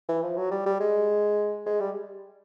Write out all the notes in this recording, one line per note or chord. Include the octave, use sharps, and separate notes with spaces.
E3
F3
F#3
G3
G3
G#3
G#3
G3